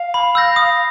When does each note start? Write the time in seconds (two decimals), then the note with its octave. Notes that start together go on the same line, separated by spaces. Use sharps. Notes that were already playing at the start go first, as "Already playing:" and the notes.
Already playing: F5
0.14 B5
0.35 E6 G6 A#6
0.56 D#6